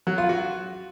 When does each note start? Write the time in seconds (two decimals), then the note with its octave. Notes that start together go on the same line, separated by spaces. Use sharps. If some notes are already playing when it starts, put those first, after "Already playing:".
0.07 F#3
0.18 F4
0.29 F#4